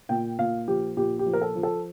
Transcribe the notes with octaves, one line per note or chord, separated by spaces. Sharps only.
A#2 G5
A#2 F5
F3 G4
A#2 G4
G4
F3
A#4
A4
F3
A4